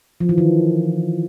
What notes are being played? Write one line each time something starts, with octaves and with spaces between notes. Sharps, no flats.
F3
E3
D#3